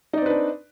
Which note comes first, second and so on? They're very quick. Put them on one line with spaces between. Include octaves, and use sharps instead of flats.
D#4 D5 C4 B4 D4